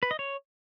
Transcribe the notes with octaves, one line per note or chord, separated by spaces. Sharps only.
B4
D#5
C#5